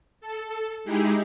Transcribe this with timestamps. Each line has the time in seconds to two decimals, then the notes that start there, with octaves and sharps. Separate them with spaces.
0.21 A4
0.84 G#3 D#4 E4 G4 G#4